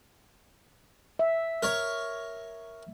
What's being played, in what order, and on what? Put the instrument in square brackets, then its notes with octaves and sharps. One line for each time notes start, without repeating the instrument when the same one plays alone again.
[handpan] E5
[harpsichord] A#4 C#5